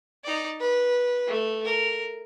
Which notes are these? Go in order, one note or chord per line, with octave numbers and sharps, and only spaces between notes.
D#4 D5
B4
A3
A#4